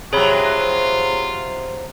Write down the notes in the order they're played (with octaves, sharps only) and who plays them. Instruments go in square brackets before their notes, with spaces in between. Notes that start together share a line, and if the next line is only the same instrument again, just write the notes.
[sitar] C3 F#3 [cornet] F4 [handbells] G#4 C#5 B5